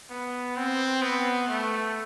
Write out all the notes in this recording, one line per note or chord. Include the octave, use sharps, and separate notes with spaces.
B3
C4
B3
A3